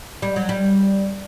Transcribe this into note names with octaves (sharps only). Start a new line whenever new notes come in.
G3
F#3
G3